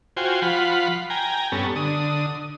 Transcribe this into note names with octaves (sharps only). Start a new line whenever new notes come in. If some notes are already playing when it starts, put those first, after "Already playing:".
F4 F#4 C5 G5 G#5
F3 F4 F#5 B5
G5 G#5 A#5
G2 B3 C#4 A4
D3 D#6